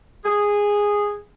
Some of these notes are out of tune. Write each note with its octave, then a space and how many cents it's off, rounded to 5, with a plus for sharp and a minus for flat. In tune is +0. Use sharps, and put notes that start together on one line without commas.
G#4 -10